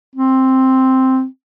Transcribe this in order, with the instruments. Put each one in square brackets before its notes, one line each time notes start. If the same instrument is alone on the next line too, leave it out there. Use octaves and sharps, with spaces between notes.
[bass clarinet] C4